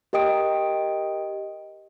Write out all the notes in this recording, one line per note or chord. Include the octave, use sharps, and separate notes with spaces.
G4 A#4 D#5 G5 D#6 D7